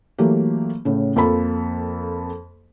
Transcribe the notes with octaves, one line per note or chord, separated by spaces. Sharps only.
E3 F#3 A3 A#3 G4
A2 C#3
F2 F3 A#3 A4 B5